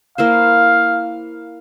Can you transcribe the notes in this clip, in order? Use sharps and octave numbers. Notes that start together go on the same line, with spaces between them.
A#3 E4 C5 F5